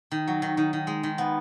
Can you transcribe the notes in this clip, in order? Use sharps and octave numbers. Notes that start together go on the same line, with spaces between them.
D#3
F#3
D#3
D#3
D#3
G#3
D#3
B3